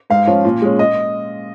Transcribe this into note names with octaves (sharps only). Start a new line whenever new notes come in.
G#2 F5
F3 C#4
A#2
G#3 C#4
D#5